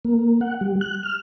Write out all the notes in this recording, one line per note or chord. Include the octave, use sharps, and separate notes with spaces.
A#3
F#5
G3
F#6
F6